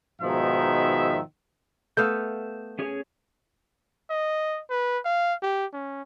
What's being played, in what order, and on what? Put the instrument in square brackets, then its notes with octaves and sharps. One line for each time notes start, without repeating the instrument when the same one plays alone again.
[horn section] G#2 B2 D#3 F3 D#4 E5
[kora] A3 B3 F5 [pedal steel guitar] E6 G6
[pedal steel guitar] C#4 G#4 C#5
[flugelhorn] D#5
B4
F5
G4
C#4